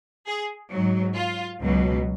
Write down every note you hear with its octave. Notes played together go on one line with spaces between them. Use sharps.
G#4
G#2 F#3
F4
C#2 B2 F#3